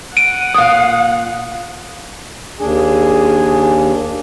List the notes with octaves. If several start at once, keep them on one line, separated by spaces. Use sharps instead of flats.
F#5 D7 D#7
A#2 F5 D#6
D#2 D4 G#4